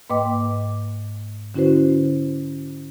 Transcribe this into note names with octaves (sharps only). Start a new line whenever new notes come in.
G#2 A#3 B4 D#5 G5 D6
D3 C#4 E4 F#4 B4 C5